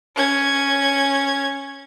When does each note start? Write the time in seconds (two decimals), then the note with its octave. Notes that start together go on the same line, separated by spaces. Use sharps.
0.15 C#4 G#6